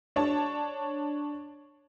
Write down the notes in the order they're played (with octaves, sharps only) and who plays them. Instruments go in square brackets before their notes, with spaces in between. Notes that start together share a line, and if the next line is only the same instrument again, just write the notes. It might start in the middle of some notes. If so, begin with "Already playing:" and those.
[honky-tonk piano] D4 C#5 A5